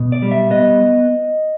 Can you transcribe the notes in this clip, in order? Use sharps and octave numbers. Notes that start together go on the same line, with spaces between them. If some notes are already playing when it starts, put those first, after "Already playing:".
Already playing: B2
D5
G3
E5
B3 D#5